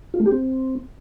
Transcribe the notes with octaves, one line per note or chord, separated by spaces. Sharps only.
F4
A3
G4
C4